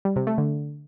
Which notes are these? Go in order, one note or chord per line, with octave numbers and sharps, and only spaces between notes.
G3
C3
A3
D3